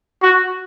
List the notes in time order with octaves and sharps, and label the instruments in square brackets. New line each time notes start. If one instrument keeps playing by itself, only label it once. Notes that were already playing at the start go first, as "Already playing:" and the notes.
[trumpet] F#4